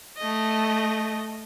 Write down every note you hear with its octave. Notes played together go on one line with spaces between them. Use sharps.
A3 D#5